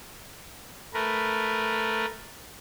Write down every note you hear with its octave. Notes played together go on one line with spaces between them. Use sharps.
A3 A#4 B4